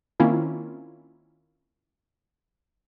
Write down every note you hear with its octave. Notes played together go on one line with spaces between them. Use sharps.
D#3 A#3 C4 C#4 E4 F4